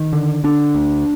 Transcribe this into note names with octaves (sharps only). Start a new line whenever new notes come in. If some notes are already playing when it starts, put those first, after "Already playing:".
Already playing: D#3
D3
D3 D4
D2